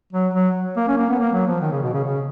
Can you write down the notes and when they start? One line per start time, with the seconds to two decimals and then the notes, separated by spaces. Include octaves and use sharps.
0.13 F#3
0.34 F#3
0.76 A#3
0.88 C#4
0.98 A#3
1.09 B3
1.20 A#3
1.33 F#3
1.47 F3
1.61 D#3
1.72 C#3
1.83 B2
1.93 C#3
2.04 C#3